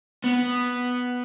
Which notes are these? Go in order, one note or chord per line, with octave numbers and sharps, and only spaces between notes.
B3